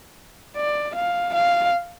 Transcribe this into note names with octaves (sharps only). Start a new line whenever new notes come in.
D5
F5
F5